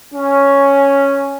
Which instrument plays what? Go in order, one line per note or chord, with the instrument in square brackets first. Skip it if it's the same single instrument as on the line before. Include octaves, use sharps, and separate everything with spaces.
[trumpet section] C#4